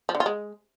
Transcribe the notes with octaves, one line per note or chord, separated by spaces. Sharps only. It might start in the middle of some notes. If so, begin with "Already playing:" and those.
F3
D3
F4
G#3